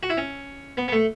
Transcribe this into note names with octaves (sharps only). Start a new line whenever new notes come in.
F#4
E4
C#4
B3
B3
A3